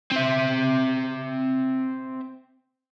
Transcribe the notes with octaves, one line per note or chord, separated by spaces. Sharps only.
C4 E5